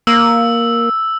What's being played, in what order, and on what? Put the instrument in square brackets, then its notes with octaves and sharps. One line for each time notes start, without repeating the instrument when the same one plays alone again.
[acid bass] A#3 [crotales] E6